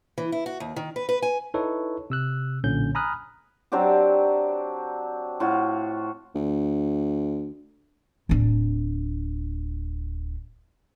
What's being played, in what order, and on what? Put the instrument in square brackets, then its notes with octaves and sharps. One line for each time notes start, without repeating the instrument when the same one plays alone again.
[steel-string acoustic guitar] E3
E4
F#4
D#2
D#3
B4
B4
G#5
[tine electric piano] D#4 E4 A4 B4 C#5
C3 E6 F#6
B1 A#2 D3 C#4 G6
G#5 A#5 B5 D#6 F6 F#6
[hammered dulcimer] F#3 C4 D4 G4
A2 F4 F#4
[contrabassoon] D2
[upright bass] D1 D4